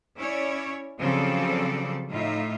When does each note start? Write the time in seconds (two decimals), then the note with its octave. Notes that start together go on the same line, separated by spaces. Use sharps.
0.17 C#4 E4 C#5 D5
0.99 C#3 F3 F#3 C4 A4 D5
2.10 A2 D#4 F4 E5